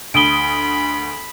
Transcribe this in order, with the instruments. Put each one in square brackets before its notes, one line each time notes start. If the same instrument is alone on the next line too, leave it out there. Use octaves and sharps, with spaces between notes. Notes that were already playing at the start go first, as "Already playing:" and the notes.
[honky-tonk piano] D2 D#6 [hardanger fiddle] B5 [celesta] D7 G7